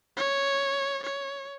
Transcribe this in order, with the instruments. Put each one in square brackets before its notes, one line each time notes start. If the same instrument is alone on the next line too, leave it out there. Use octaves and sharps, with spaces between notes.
[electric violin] C#5
C#5